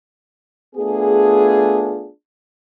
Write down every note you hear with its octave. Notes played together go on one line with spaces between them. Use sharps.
A3 B3 D4 F4 G#4